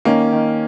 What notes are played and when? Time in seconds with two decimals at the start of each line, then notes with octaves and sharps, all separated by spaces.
0.05 D#3 A#3 C#4
0.32 D#3